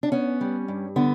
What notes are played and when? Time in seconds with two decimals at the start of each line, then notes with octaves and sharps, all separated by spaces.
0.03 D4
0.12 B3 C#4
0.41 G3
0.68 G2
0.96 D3 B3